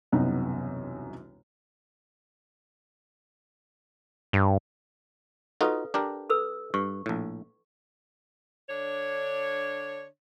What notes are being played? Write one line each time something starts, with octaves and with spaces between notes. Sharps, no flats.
E1 C2 F#2 C3 B3 D#4
G2
D#4 F4 F#4 A4 B4 F5
D4 G4 A#4
A4 B4 E6
G2 C#6
A#1 A2
D3 D4 C#5